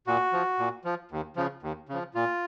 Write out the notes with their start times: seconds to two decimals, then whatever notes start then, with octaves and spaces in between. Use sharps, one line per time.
0.07 A#2 F#4
0.33 F3
0.59 A#2
0.85 F3
1.11 D#2
1.36 C#3 F3
1.63 D#2
1.89 C#3 F3
2.15 A#2 F4